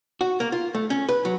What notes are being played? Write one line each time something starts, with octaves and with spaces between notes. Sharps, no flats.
F#4
A#3
F4
A3
C#4
B4
F#3